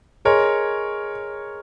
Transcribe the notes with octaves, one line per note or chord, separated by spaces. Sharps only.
G#4 A#4 C#5 D#5 G#5 C6